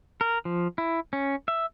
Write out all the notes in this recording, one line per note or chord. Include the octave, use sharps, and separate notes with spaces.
A#4
F3
E4
C#4
E5